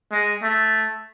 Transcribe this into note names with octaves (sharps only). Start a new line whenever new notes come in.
G#3
A3